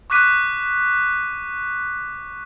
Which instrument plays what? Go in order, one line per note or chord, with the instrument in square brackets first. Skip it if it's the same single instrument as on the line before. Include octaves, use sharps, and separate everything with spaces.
[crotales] C#6 D6 F#6 B6 D#7